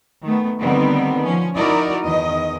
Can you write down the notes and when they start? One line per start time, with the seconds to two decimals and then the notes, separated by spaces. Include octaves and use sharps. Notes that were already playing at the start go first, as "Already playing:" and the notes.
0.24 D#3 A3 B3
0.61 D3 D#3 G3 B3 C4
1.24 F3 C#4
1.56 D#4 E4 F#4 A#4 D5 D#5
2.04 E2 D#3 D#5